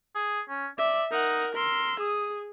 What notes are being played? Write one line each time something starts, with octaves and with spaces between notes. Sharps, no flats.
G#4
C#4
D5 E5
D#4 A#4 F#5
A#4 C6 E6
G#4 D#6